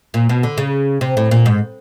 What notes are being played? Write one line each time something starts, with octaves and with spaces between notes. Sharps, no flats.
A#2
B2
D3
C#3
C3
A2
A#2
G#2